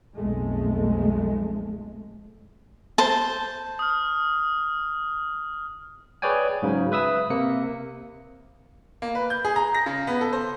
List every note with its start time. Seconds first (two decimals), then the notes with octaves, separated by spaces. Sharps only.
0.15 B1 F2 G#3 A3
2.98 C5 A5
3.79 D#6 F6
6.22 G#4 B4 C#5 D5 G5 G#5
6.62 G#2 C#3 F#3
6.92 B4 E5 D#6 E6
7.30 C3 A#3 C#7
9.02 A#3
9.15 B4
9.30 G6
9.45 G#4
9.56 A#5
9.75 A#6
9.86 C#3
10.07 B3
10.21 A4
10.33 C5